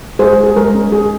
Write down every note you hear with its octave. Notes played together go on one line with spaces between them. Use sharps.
G#3 G#4 C5
G#3
G#4
G#3 A#4
C#4
G#3 G#4